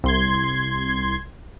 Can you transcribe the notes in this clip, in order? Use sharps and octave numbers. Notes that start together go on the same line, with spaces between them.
C2 C6 G#6